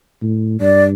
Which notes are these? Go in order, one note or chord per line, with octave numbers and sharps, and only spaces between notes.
A2
G2 D5